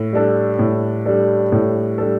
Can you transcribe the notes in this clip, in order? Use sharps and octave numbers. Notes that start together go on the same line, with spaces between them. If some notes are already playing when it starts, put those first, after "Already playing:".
Already playing: A2
G3 D4 A4
A2
G3 D4 A4
A2
G3 D4 A4